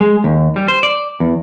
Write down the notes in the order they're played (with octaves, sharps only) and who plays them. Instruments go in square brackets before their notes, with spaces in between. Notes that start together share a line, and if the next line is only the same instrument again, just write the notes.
[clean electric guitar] G#3
D#2
G3
C5
D5
E2